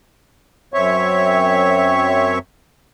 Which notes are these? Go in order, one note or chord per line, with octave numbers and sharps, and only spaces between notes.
F#2 C4 C#5 E5 C#6